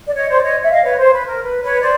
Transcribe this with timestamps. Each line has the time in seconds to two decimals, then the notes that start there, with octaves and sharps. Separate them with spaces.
0.08 D5
0.15 C#5 D#5
0.29 C5 D5
0.42 C#5 D#5
0.63 E5
0.70 D#5 F5
0.83 B4 C#5
0.98 C5
1.12 B4
1.26 A#4
1.43 B4
1.62 B4 C#5
1.81 C5 D5